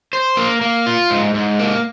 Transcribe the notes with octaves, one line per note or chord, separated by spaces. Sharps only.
C5
A#3
A#3
F4
G#2
G#2
A#3